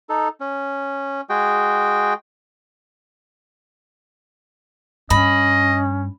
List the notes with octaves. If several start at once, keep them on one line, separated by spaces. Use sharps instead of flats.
D#4 A4
C#4
G#3 F#4 G#4 G5
G2 C#4 D#5 B5